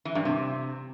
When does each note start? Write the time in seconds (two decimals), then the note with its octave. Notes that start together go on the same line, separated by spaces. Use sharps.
0.05 E3
0.15 G2
0.25 C3